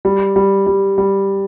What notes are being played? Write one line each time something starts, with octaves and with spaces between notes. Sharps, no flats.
G3
G3
G3
G3